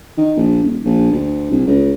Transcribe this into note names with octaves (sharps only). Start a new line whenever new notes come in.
D#3
A#1
D#1
A#1
D2
C2
C#2